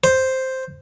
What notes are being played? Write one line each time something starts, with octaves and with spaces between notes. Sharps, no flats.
C5